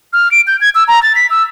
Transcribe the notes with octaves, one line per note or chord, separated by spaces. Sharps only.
F6
D7
G6
G#6
E6
A#5
A6
B6
E6